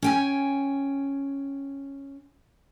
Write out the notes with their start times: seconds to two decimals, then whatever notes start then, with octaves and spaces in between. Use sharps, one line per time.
0.02 C#4 G5 G#5